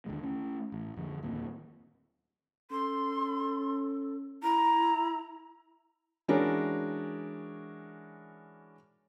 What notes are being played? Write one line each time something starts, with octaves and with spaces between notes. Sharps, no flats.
D#2 D3 G#3
A3 C#4
A1
F2 D3
D1 D#3 A#3 C4
C#4 A4 C6
E4 A#5
E3 G#3 C#4 D4 F#4 A#4